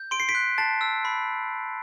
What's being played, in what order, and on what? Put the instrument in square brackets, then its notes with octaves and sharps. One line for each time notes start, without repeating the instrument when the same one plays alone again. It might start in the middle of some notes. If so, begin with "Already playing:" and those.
Already playing: [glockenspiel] G6
C6 D7
C7
B6 D7
F#6
A5 A6 C7
E6
B5